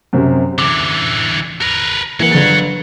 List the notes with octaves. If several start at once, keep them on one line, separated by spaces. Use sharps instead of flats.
F#2 C3 C4
D3 E3 D6
A#4 B4
E3 F#3 A#3 F#5
G1 A6